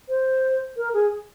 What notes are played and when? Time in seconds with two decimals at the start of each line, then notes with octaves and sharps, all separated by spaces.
0.09 C5
0.77 A#4
0.93 G#4